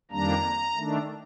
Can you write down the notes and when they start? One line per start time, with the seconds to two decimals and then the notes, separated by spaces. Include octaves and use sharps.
0.11 F2 D#3 G3 A#3 D4 A#5
0.76 D#3 A3 D4